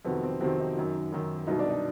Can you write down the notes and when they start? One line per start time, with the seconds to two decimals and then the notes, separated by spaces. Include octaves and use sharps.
0.05 F2 C3 D#3 F#3 B3
0.23 C4
0.40 F2 C3 D#3 F#3 C4
0.59 D#4
0.76 F#2 D#3 F#3
1.12 F#2 D#3 F#3
1.47 C2 B2 F#3 D#4
1.59 D4
1.69 D#4